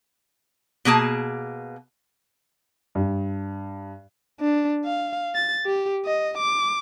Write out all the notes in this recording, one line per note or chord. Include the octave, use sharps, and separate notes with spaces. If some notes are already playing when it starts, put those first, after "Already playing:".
B2 A#3 G#4 A5
G2
D4
F5
A6
G4
D#5
D6